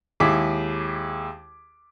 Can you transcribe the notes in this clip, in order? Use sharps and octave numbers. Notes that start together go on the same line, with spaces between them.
D#2 G#3 E4 G#4 D6 B6